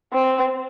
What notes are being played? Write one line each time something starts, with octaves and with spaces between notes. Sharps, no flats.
C4